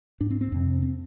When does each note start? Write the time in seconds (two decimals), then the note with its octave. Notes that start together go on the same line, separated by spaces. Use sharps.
0.21 G#2 D4
0.30 C4
0.41 C4
0.52 F2 C3
0.82 C4